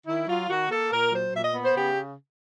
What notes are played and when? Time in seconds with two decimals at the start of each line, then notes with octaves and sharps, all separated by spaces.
0.07 D#3 E4
0.28 F#3 F4
0.49 D#3 F#4
0.70 A#3 A4
0.91 A#2 A#4
1.12 F#3 C5
1.33 A#2 E5
1.44 D#5
1.54 B3
1.65 C5
1.75 C#3 G4